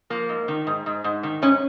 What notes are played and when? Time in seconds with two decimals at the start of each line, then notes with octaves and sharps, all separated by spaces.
0.10 F3 A#3
0.29 G#2
0.48 D#3
0.67 G#2
0.86 G#2
1.04 G#2
1.23 D#3
1.42 G#2 C#4